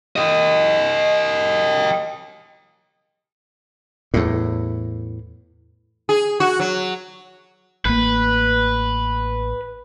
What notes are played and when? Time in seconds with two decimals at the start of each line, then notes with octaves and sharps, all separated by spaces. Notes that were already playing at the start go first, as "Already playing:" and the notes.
0.16 G4 D#5
4.14 E2 A2
6.09 G#4
6.40 F#4
6.59 F#3
7.85 A1 A#3 B4